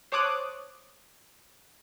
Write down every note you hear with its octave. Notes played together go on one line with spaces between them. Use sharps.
C5 C#5 A5 D6 D#6 F#6